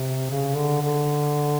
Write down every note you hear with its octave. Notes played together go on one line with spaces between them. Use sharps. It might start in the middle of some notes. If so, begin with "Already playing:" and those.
Already playing: C3
C#3
D3
D3